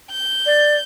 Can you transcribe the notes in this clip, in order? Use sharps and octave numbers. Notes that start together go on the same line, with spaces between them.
G6
D5